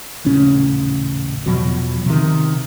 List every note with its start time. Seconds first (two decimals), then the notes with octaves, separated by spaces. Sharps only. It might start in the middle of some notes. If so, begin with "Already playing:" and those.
0.24 D#1 A1 C#3 C#4
1.46 E2 B2 F3 F#3
2.06 C3 D#3